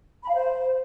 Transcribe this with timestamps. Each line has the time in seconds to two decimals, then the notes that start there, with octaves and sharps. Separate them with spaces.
0.23 B5
0.29 F5
0.34 C5